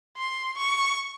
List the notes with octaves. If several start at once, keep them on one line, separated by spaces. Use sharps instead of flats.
C6
C#6